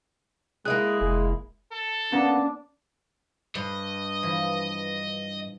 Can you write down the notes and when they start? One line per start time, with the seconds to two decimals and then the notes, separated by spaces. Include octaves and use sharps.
0.65 G#3 A#3 E4 G#4 F#6
1.01 F1 G#3
1.72 A4
2.12 A#3 B3 C#4 D4 A#5
3.55 G2 D#5
4.23 E3 F3